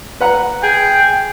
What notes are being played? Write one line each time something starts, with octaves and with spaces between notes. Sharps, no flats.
B4 F#5 A#5
G#4 G5